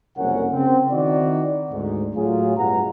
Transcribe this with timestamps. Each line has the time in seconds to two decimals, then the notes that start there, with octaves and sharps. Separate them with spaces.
0.17 F#1 C2 F2 C#4 A#4 F#5
0.53 C#3 C4
0.91 D#3 C4 D#4 E4 F#4 D5
1.72 D2 G#2
2.16 A2 F#3 F4 G#4
2.57 G2 B2 F#5 A#5